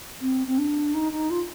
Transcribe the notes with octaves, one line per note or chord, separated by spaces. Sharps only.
C4
C4
D4
D#4
D#4
F4